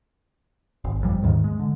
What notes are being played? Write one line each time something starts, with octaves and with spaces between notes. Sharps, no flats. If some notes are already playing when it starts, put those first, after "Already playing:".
G#1
G1 F2 G3
D#2 G#2 D#3
G#3
D3